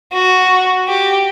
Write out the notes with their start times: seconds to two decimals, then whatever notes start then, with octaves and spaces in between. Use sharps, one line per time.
0.13 F#4
0.88 G4